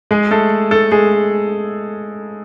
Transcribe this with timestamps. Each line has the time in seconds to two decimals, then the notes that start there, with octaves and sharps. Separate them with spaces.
0.11 G#3 G#4
0.31 A3 A4
0.71 A3 A4
0.92 G#3 G#4